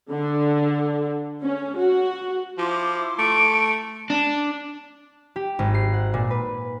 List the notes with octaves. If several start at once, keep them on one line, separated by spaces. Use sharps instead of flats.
D3
C#4
F#4
F3 E4 C6 D6
A3 D7
D4
G4
G#1
C7
F#5
A#2
B4